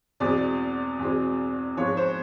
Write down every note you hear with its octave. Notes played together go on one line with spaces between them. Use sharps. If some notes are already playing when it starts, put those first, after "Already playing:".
E2 B2 G#3 C4 D5
E2 B2 G#3 C4
G#2 F3 G#3 B3 C#5
C5